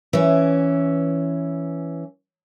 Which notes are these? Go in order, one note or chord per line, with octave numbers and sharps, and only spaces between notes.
E3 C#4